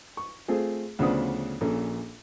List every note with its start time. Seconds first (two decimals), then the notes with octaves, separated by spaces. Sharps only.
0.17 C#6
0.48 A3 C4 F4 G#4
0.99 D2 C#3 F3 B3 D4 D#6
1.61 A#1 A#2 C#4 A4